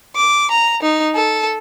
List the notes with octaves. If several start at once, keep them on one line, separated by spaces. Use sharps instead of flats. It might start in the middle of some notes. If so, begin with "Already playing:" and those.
D6
A#5
D#4
A4